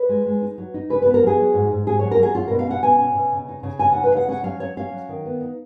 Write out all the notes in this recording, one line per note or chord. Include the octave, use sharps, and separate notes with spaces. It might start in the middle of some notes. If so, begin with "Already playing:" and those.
Already playing: B4
G#3
G#3
D#4
F#3
D#4
C#3 B4
B4
B3
A#4
F#3 G#4
F#3
G#2
G#2
G#2 G#4
F#3 C#5
A#4
F#3 G#4
C#4 F4
B2 A#4
F5
C#4 F#5
B2 G#5
C#4
B2
C#3
D#4
C#3
C#3 G#5
D#4 F#5
B4
C#3 F5
F#5
C#4 F#5
F#3 F5
F#3 C#5
C#4 F5
F#3
D#3
B3
D#4